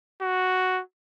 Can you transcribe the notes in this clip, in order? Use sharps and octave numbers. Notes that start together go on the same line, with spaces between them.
F#4